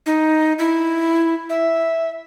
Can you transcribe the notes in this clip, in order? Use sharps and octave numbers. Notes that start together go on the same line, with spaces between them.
D#4
E4
E5